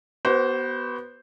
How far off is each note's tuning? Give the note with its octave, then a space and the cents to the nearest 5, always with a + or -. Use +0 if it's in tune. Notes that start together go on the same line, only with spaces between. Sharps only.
B3 -10 F#4 +40 C5 +0